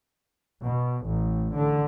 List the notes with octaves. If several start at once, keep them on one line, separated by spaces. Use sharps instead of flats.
B2
A1
D3